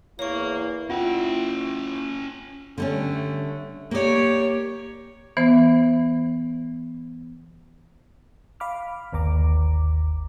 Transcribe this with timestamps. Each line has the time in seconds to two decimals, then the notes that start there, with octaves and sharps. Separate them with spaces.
0.19 E2 A#3 E4 C#5 C#6
0.90 C#4 E4 F4 F#5 G5
2.78 D3 G3 A3 C#4
3.91 A#3 G4 C#5 D5
5.37 E3 B3 C5
8.60 F5 B5 D6 F6
9.13 G1 D#2 A#5 D6